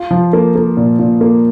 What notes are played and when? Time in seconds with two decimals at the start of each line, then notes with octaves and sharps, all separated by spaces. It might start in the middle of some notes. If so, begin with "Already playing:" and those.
Already playing: F4
0.11 F3
0.33 A#3
0.55 A#3
0.77 A#2
0.99 A#2
1.21 A#3